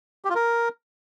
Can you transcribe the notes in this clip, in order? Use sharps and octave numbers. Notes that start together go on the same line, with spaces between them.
G4
F4
A#4